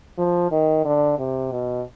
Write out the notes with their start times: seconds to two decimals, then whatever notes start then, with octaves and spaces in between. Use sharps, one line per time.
0.18 F3
0.51 D#3
0.85 D3
1.19 C3
1.51 B2